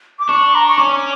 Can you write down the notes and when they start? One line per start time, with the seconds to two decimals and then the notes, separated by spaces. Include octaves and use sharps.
0.19 D6
0.28 D4 C#6
0.55 A#5
0.67 C#6
0.78 C#4 D6